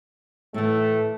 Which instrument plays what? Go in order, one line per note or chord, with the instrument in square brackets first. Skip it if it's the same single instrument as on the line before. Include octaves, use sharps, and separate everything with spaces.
[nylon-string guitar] A2 E3 [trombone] A3